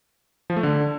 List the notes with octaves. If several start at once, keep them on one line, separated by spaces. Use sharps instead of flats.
F3
A3
D3